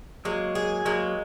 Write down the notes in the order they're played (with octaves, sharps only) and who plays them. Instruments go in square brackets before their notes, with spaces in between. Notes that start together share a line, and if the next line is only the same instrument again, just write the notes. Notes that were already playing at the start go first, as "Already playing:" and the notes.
[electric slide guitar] F#3 A#3 [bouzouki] G#3
[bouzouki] G#4
[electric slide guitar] F#3 A#3 [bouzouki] G#3